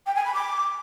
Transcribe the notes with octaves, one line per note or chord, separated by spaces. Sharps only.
G5
G#5
B5
D6